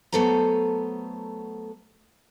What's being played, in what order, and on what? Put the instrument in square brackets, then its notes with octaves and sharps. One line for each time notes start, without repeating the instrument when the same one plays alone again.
[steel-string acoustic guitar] F#3 A3 B3 A4 C5 A#5